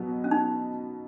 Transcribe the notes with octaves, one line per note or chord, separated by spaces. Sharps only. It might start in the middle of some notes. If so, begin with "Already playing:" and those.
Already playing: B2 F#3 B3
C#4
D#4